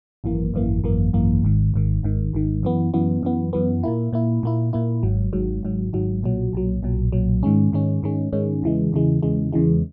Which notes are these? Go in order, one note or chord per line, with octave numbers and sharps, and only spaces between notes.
G#1 F#2 E3 A#3
G#1 F#2 E3 A#3
G#1 F#2 E3 A#3
G#1 F#2 E3 A#3
G#1 G#2 D#3
G#1 G#2 D#3
G#1 G#2 D#3
G#1 G#2 D#3
F#2 E3 B3
F#2 E3 B3
F#2 E3 B3
F#2 E3 B3
A#2 A#3 E4
A#2 A#3 E4
A#2 A#3 E4
A#2 A#3 E4
G#1 G#2 F#3
G#1 G#2 F#3
G#1 G#2 F#3
G#1 G#2 F#3
B1 A#2 F#3
B1 A#2 F#3
B1 A#2 F#3
B1 A#2 F#3
G#2 D#3 G#3 C#4
G#2 D#3 G#3 C#4
G#2 D#3 G#3 C#4
G#2 D#3 G#3 C#4
E2 C#3 E3 G#3
E2 C#3 E3 G#3
E2 C#3 E3 G#3
E2 C#3 E3 G#3